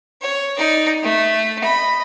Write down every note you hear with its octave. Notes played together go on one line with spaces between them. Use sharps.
C#5
D#4 D5
A3
D#5 B5